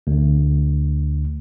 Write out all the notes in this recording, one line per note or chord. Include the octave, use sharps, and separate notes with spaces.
D2